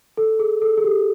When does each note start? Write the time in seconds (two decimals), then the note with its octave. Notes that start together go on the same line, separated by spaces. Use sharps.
0.17 A4
0.39 G#4
0.62 A4
0.77 G#4
0.84 G4